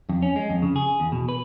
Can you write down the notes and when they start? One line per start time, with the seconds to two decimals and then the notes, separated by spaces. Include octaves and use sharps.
0.09 F2
0.22 C#4
0.36 G#3
0.50 F2
0.62 C#3
0.76 G#4
1.00 E2
1.12 B2
1.29 B4